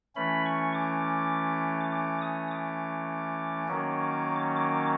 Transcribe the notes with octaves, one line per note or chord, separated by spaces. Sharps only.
E3 A3 C#4 B5
C#6
D6
D6
D#6
D6
D#3 F#3 A#3 C#4
D6